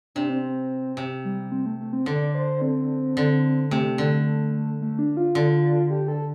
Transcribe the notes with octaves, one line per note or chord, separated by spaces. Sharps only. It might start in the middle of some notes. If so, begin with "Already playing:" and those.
C3 D4
C4
C4
C3
G3
C4
A3
A3
C4
D3 D5
C5
C4
D3
C3 A3
D3
A3
D4
F4
D3
G4
A4